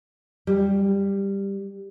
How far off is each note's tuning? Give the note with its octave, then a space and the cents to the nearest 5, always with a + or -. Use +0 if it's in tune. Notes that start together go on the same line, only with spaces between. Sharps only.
G3 +10